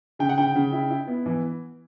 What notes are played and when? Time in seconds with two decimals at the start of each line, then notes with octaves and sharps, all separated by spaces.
0.19 C#3 G5
0.29 F#5
0.38 C#3 G5
0.55 C#3
0.72 E4
0.90 E4
1.07 B3
1.26 E3